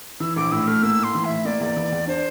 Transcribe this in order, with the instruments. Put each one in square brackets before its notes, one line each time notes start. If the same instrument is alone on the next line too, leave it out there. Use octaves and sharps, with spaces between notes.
[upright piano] E3 [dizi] E6
[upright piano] A#1 [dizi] D6
[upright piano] A2 [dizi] E6
[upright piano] A3 [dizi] F6
[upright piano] A#3 [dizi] E6
[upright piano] A2 [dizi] C6
[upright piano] E3
[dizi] E5
[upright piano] A2
[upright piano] A#3 [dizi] D5
[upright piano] E2
E3
E2
[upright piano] D4 [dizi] C5